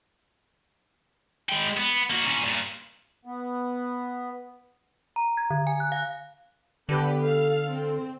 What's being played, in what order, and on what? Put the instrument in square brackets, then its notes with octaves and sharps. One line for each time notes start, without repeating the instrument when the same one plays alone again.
[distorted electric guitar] G#3 G5
B3
A#3 F#4
A#2 C#4
G2 A#2
[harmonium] B3
[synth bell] A#5
G#6
D3
G#5
F#6
F5
[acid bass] D3 [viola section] B3 G4 B4
[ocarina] A4 [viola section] F5
[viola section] C4